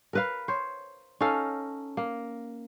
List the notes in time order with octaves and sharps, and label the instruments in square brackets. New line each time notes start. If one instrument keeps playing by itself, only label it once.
[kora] A#4 B4 F5
C5 C#5
C#4 D#4 A4 F5
A#3